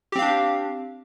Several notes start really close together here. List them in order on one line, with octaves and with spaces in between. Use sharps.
G4 C4 F5 D4